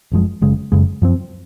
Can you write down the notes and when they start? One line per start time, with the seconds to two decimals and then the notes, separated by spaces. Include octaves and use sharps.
0.12 F#1 F#2 F3 G#3
0.41 F#1 F#2 C#3 G#3
0.72 F#1 F#2 C#3 G#3
1.02 F#2 F3 C4